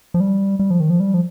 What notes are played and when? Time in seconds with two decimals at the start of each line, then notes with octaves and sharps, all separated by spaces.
0.14 F3
0.20 G3
0.59 G3
0.70 F3
0.80 D#3
0.90 F3
1.00 G3
1.14 F3